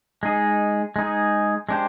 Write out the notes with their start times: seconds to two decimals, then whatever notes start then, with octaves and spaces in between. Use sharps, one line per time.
0.23 G#3 D#4 G#4
0.96 G#3 D#4 G#4
1.69 G#3 D4 G4 C5